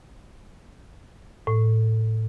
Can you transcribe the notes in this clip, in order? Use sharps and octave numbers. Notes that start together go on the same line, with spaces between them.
A2